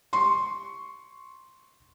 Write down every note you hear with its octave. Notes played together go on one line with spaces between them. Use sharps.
C6 C#6